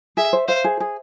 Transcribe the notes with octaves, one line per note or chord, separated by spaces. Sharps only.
G#4 E5
C5
C5 F5
G#4
G#4